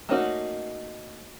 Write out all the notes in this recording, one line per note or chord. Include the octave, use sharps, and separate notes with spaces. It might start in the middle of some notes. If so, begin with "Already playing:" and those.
A3 A#3 C#4 D#4 F#4